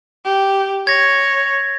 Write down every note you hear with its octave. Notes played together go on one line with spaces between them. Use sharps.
G4
C#5 G#6 A#6